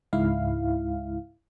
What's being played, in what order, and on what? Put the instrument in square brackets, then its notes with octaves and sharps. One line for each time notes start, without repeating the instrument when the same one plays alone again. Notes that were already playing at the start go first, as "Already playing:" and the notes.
[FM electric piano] C#2 G#2 E4 F5